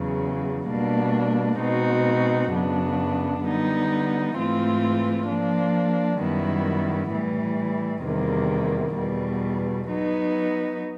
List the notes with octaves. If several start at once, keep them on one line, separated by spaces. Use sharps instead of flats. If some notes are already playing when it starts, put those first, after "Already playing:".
Already playing: E2 C#3 F#3
B2 G3 A#3 D4
B2 G#3 C4 D#4 F#4
F#2 C#3 F#3 B3 D4
D3 G3 B3 D#4
G#2 E3 A3 C4 F4
F3 A#3 D4
F#2 D#3 G3 B3 E4
A2 E3 G3
E2 C3 D#3 G3 A#3
E2 B2 G3
F#3 B3 D#4